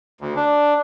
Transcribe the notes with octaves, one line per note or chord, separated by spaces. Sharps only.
D2
D4